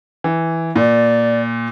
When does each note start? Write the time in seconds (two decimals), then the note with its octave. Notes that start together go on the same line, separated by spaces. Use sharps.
0.24 E3
0.76 A#2 D5